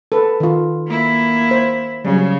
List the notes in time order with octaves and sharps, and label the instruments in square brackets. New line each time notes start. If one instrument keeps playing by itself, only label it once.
[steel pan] A4 B4
D#3 F4
[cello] A#3 E4
[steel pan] C5
[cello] C#3 [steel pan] F#3 G3